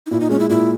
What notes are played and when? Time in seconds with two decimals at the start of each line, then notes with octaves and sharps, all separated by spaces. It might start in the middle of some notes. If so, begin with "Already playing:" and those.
0.06 D#4
0.11 A#2 E4
0.20 D#4
0.29 G#3 C#4
0.39 E4
0.50 A#2 E4